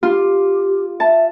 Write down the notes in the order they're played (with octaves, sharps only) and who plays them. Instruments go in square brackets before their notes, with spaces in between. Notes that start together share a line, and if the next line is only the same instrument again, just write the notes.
[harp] F4 [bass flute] G4
[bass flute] E5 [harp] A5